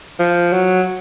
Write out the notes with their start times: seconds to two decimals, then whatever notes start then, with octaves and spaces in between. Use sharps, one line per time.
0.20 F3
0.53 F#3